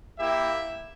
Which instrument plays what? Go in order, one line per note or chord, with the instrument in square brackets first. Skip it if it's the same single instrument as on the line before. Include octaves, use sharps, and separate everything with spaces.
[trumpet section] A#3 E4 G4 E5